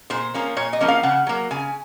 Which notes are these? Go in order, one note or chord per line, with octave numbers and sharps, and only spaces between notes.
A#2 C5
F3 A#3 C#4
A#2 C#5
D#5
F3 A#3 C#4
F5
C#3 F#5
F#3 A#3
C#3 G#5